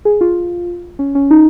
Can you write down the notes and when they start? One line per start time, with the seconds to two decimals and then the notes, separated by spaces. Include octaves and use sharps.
0.05 G#4
0.21 F4
0.99 C#4
1.15 C#4
1.31 D#4